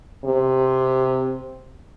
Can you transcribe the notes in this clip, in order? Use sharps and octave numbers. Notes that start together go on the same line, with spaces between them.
C3